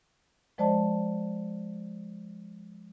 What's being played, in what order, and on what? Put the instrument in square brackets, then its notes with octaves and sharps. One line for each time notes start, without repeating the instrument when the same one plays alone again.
[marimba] F3 G#3 C5 D5 D#5 A5